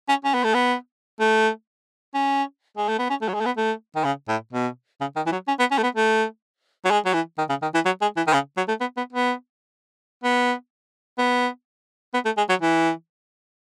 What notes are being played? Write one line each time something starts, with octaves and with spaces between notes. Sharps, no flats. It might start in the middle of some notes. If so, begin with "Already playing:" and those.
C#4
C#4
B3
A3
B3
A3
C#4
G#3
A3
B3
C#4
A3
F#3
G#3
A3
B3
A3
D#3
C#3
A2
B2
C#3
D#3
E3
F#3
C#4
B3
C#4
A3
B3
A3
F#3
G#3
F#3
E3
D#3
C#3
D#3
E3
F#3
G#3
E3
D#3
C#3
F#3
A3
B3
B3
B3
B3
B3
B3
A3
G#3
F#3
E3